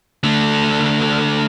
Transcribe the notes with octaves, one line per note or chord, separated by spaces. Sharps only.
D3 A3